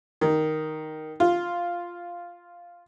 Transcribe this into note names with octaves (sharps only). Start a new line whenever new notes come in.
D#3
F4